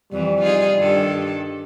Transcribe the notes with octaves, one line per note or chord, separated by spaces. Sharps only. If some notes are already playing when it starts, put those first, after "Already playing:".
F2 E3 G3
D#4 F4 G#4
G2 D#3 A4